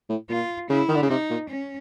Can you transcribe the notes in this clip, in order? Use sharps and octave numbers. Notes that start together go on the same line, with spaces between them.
A2
A#2 F4
C#3 E4
D#3
D3
C#3
C3 D#4
A#2
C#4